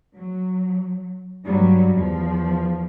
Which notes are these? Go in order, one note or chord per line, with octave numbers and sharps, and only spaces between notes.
F#3
G2 F#3 G3
E2 F3